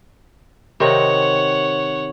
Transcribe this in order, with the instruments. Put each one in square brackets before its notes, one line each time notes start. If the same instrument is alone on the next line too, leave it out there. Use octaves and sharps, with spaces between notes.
[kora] C3 D#3 C4 [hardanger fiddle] C#5 F#5